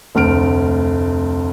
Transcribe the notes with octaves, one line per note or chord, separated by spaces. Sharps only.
F1 D2 F6 D7